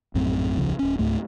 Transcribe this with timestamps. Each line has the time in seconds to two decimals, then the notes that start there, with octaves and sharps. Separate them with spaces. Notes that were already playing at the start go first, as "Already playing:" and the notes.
0.14 A#1 F#2 A2 C4
0.57 D#1 C2 C#3 F3
0.79 D1 C#4
0.99 C#2 G#2 A3